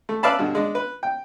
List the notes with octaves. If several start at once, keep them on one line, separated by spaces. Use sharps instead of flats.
A3
B4 D5 E5 F5 A5 B5
G2 B2 D3
G#3 D4
B4
G5